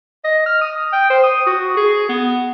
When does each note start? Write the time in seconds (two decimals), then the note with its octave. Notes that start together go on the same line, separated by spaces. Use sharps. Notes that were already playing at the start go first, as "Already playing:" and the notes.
0.24 D#5
0.46 F6
0.62 D#6
0.92 G5
1.10 C5
1.23 D#6
1.47 F#4
1.77 G#4
2.09 B3